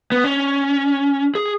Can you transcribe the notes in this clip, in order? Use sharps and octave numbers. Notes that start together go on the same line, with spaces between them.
B3
C#4
G#4